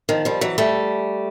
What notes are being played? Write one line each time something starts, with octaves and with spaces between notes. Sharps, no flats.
D#3 F3
F3 G3
E3 F#3
G3 A3